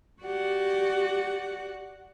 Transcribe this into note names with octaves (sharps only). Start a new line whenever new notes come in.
F#4 G4 D5 F#5